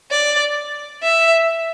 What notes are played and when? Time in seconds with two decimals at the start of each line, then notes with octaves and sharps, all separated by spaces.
0.11 D5
1.03 E5